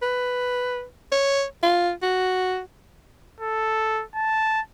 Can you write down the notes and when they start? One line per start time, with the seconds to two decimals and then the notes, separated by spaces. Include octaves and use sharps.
0.02 B4
1.12 C#5
1.63 F4
2.02 F#4
3.41 A4
4.15 A5